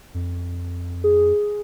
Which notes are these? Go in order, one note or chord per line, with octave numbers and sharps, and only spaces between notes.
F2
G#4